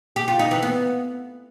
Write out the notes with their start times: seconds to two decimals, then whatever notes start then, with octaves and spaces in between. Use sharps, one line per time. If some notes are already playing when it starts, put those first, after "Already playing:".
0.16 G4
0.28 F4
0.39 D#4
0.51 E3
0.63 B3